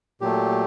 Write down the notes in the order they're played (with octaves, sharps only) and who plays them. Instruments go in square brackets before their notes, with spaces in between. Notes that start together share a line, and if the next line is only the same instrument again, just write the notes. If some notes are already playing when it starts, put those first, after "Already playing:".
[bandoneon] A#2 F#3 A3 G4